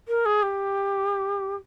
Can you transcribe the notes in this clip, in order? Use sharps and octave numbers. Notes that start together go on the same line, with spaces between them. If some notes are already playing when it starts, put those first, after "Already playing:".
A#4
G#4
G4